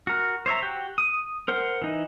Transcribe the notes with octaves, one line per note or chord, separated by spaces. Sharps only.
F#4 A#4
C5 C#5 E5 A#5
F#4 G4 G5
D#6
A#4 C5 F#5
E3 D#4